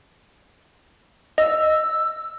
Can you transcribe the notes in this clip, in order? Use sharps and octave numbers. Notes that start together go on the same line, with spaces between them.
D#5 E6